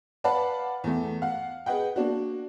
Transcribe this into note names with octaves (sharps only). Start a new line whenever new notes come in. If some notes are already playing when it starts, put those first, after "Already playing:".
B4 D5 F5 F#5 A5 B5
E2 A3
F5 F#5
G#4 B4 D#5 F#5 G5
A#3 D4 F#4